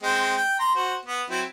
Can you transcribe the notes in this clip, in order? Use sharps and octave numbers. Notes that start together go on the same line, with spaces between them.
G#3 C4 G5
G5
A#5 C6
F#4 C5
B3
F#3 C4 E4